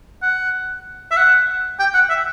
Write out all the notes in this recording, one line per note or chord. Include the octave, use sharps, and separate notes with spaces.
F#5
E5
F#5
G5
F#5
E5